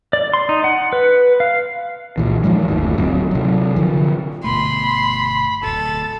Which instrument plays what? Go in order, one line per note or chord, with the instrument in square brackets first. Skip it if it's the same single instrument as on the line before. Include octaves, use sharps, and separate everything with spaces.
[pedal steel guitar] D5
C6
D#4
F#5
B4
F5
[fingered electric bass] C#2 A#2 E3
D#3 F3 G#3 A3
G1 D#2 A2 D#3
D1 F#3 C4
C3 F#3
D3 F3
[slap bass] G1 B2 A3 [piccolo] B5 [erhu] C6
[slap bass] D1 B2 [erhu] A4 [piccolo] A6